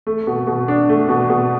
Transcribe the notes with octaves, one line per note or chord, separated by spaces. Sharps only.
A3
B2
B2
D4
A3
B2
B2